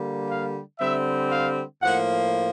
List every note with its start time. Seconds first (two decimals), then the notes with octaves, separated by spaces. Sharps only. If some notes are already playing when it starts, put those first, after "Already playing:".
Already playing: D3 G3 A#3
0.28 F5
0.79 D3 G3 C4 E5
1.31 F5
1.81 A2 F3 A#3 F#5